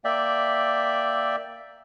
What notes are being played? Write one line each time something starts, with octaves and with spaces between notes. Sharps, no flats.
A#3 D5 E5 G5